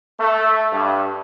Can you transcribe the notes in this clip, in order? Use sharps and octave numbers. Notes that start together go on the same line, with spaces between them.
A3
G2